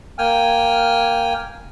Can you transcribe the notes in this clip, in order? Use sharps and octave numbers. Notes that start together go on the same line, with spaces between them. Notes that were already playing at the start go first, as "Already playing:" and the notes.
A#3 G5 G#5 F6